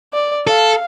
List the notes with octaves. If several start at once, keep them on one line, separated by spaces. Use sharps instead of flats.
D5
A4 F5